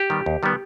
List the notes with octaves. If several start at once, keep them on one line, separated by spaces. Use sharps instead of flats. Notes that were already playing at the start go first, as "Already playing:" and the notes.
Already playing: G4
D#3 G3 B3
D#2
D#3 G3 B3